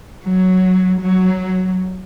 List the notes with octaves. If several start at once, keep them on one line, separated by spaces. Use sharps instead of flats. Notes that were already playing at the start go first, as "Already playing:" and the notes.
F#3
F#3